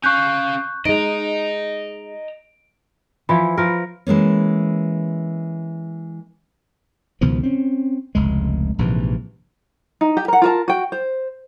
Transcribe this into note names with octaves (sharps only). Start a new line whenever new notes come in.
C#4 F5 C#6 F#6 G6
G#3 D#4 D#5 A#5 D7
E3 F3 E4 B5
F3 A#4
E3 G#3 A#3 C#4
C#2 B2 D#3 F3
C4 C#4
F1 C#2 G#3
A#1 G#2 C3 E3
D#4
G4
A#4 F#5
F4 A#4 A5
F#4 G5
C5